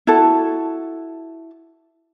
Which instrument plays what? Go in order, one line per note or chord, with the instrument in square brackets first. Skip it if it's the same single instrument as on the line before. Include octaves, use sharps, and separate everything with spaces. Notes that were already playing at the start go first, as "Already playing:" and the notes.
[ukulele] E4 F#4 A4 A5